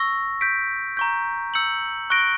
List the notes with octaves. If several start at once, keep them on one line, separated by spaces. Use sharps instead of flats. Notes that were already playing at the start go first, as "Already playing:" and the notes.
Already playing: C#6 E6 A#6
G6 B6 D7
A#5 C#6 G6
E6 G6 C#7 F#7
C#6 F#6 A#6 D7 G7